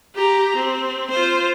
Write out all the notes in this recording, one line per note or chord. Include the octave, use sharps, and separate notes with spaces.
G4 A#5
C4
F4 C5